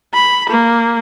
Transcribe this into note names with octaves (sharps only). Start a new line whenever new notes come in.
B5
A#3